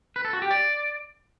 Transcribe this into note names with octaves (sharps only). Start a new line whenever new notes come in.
B4
A4
F#4
G4
D5